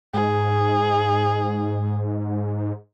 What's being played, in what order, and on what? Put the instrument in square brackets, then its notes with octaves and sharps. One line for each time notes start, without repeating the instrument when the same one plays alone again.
[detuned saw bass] G#2 [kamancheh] G#4